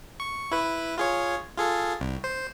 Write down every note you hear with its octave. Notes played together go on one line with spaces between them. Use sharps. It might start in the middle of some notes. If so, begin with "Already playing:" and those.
C#6
E4 B4
F4 G#4 C#5
F4 G#4 A4
C2
C5